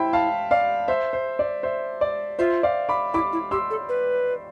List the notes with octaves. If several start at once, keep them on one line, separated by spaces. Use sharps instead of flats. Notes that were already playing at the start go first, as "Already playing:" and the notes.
Already playing: E4 C5 E5 G5 B5
F5 A5
D5 F5
C5 E5
C5
D5
C5 E5
D5
F4 C5 E5
D5 F5
B5 D6
E4 B5 D6
E4
G4 C6 E6
A4
B4